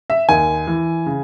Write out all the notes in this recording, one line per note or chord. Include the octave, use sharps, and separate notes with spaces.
E5
D#2 G#5
E3
C#3